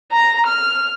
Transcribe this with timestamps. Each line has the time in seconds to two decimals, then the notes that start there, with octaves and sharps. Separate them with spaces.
0.13 A#5
0.47 F6